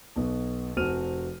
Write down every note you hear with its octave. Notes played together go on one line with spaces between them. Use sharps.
B1 B2
F1 C4 F#4 F6 D#7 F7